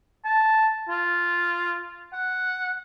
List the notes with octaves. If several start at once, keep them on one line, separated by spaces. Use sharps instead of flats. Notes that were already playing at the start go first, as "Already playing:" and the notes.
A5
F4
F#5